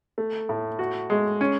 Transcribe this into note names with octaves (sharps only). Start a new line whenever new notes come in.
A3
A2
F#4
G#3
C#4